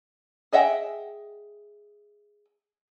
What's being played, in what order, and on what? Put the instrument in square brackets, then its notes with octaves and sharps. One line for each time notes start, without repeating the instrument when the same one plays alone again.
[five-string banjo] G#4 D#5 E5 F#5 G5